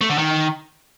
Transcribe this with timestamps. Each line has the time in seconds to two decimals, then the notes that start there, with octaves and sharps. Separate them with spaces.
0.01 A3
0.10 D3
0.18 D#3